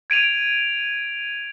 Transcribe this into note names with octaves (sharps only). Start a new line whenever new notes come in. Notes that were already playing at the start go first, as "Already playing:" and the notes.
G#6 D7 D#7 F7